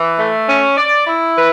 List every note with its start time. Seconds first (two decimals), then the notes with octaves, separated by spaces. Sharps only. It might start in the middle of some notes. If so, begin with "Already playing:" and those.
Already playing: E3
0.18 A3
0.49 C#4
0.77 D5
1.07 E4
1.36 B4